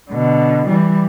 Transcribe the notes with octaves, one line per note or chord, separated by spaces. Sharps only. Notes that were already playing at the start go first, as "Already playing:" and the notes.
B2 D3
E3 G3